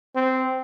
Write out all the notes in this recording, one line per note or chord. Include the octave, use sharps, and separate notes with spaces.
C4